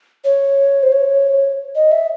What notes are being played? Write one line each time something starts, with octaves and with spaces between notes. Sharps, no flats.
C#5
C5
C#5
D#5
E5